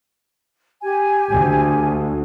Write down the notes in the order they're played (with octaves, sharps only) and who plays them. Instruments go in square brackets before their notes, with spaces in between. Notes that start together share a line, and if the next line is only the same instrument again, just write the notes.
[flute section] G4 G#5
[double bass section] D2